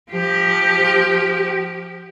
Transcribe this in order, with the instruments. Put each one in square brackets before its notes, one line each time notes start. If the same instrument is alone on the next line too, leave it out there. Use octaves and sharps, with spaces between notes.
[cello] F3 G4